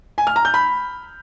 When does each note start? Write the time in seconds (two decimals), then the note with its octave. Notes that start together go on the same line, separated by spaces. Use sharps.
0.18 G#5
0.27 F6
0.36 A#5
0.45 G6
0.54 B5